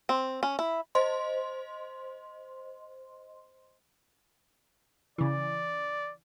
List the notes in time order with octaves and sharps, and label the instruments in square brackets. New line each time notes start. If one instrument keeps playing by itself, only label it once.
[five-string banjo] C4
C#4
E4
[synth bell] C5 D#5 C6
[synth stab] C#3 E3 [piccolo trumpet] D5